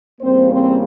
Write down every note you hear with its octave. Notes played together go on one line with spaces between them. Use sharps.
E2 C#3 G3 A#3 C4 C5
C4 C5